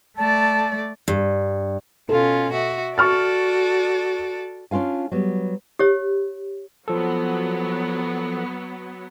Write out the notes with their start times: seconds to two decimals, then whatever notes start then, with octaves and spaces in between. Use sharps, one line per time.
0.18 A3 D5 A5
1.08 G2
2.09 B2 C#4 F4 A4
2.53 F#4 E5
2.98 F#4 A4 D5 C#6 F6 A6
4.71 C#4 D4 F4 F5 G#5
5.12 F#3 G3 B3
5.79 G4 C#5
6.88 F3 F#3 B3 A4